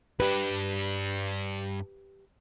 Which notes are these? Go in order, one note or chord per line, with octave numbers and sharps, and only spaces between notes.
G2 D4 G4 B4